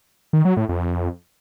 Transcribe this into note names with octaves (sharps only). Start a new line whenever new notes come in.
D#3
F#3
A2
F2